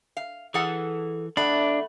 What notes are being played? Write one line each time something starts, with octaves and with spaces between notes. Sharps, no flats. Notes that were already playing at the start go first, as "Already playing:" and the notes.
F5
E3 G#4 A4 F#5
E2 A3 D4 F#5 B5